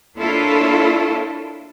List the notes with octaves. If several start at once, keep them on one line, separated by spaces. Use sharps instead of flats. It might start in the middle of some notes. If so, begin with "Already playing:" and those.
A#3 D4 E4 F4 A4 C#5